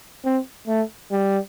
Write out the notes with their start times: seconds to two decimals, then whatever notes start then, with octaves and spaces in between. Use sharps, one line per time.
0.25 C4
0.68 A3
1.12 G3